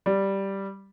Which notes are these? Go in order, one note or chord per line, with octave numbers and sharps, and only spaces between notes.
G3